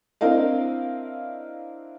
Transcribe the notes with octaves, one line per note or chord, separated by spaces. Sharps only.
C4 D4 E4 A#4 D#5 F5